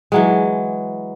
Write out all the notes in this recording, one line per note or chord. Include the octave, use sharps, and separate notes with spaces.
E3 F#3 G#3